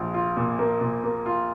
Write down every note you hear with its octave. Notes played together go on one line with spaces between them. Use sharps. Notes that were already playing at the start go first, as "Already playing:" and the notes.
Already playing: A#1 F4
F4
A#2
A#3
A#2
A#3
F4